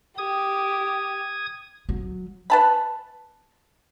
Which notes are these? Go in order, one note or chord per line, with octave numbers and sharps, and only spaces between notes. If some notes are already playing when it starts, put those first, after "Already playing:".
G4 D#6 G#6
F#3
B4 A5 B5